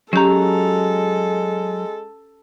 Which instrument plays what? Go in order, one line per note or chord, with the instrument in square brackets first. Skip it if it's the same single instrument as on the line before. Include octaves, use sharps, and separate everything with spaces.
[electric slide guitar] F#3 A#5 [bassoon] G#3 [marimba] C#4 G4 [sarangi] A4